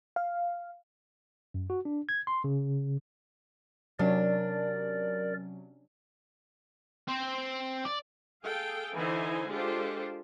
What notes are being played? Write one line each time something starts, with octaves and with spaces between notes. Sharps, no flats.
F5
F#2
F#4
D4
G#6
C6
C#3
C3 F#3 C#4 D4 A#4 D5
C4 C5
D5
G#4 A4 F5 G5
D3 E3 D#4 E4 C5 G#5
G#3 D4 F4 G4 A4 C5